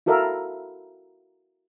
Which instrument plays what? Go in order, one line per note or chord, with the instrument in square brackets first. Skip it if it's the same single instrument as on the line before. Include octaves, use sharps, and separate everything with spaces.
[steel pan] E4 F#4 A4 A#4 E5 F5